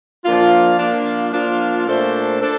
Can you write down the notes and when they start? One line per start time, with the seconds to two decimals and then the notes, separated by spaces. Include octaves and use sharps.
0.25 F3 A#3 D4 F4
0.79 F3 A#3 D4 F4
1.33 F3 A#3 D4 F4
1.86 A#2 A3 D4 A4 C5
2.41 D4 A4 C5